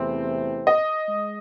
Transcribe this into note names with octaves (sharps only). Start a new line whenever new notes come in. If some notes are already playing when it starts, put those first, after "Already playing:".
Already playing: E2 C3 E3 A3 C4
D#5
G#3